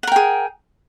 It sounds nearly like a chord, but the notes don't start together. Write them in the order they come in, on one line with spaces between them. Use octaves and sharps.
F#5 A#4 G5 G#4